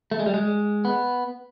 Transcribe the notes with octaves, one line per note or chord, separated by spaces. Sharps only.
A3
G#3
G3
G#3
B3